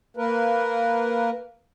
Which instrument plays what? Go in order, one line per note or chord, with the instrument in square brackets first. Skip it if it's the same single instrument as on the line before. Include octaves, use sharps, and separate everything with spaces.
[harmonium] A#3 A#4 B4